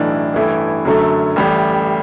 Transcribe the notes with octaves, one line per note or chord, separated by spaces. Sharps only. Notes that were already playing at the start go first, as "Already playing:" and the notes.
Already playing: B1 A2 E3 A3 D4
A1 G2 E3 A3 E4
F#2 D3 F#3 A3
A1 A2 G3